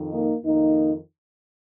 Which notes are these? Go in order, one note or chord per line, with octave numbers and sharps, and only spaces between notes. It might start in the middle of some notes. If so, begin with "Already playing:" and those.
Already playing: F2 D#3
A#3 D#4
F2 D#3 A#3 D#4